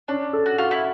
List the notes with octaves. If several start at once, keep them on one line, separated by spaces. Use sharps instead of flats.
C#4 D4
A4
F#4
F4 F#4
E4